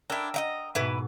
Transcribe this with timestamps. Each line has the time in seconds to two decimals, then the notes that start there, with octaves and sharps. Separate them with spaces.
0.10 D4 E4 A#4 G5 E6
0.34 D#5 E5 A#5
0.75 G#2 B2 E4 B4